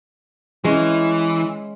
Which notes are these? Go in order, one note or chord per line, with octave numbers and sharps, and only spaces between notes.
E3 G#3 C#4